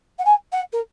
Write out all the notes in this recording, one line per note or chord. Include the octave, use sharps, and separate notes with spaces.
F#5
G#5
F#5
A#4